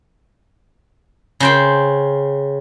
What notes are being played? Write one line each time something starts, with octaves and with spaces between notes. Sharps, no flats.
C#3 C5 G5